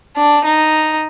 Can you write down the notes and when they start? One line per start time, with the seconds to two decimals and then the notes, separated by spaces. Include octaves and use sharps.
0.17 D4
0.45 D#4